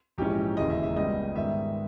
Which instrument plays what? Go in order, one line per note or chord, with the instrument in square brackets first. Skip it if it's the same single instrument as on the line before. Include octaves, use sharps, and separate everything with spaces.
[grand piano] A#1 G#2 E3 G#3 C#4 G4
E1 D#2 C#3 E3 G#3 D#5
E5
E5
C#2 C#3 G3 B3 D#5
G#2 D#3 G3 B3 E5